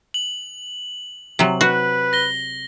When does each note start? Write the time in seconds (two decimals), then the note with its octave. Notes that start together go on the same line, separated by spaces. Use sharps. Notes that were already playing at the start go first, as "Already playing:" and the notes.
0.14 F#7
1.39 C3 F#3
1.61 F#4 B4
2.13 A#6 G7